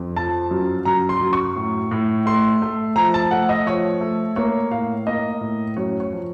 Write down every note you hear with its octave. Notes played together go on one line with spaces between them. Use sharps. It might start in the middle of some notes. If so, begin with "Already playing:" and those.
Already playing: F2
F3 A5
F#2
F#2 A#5
C6
F#2
C#6
A2
A2
A3 C6
A3
F3 A#5
A5
A3 F#5
D#5
F3 C#5
A3
A#3 C#5
A2 F5
A#3 D#5
A2
F#2 C#5
C#5
F3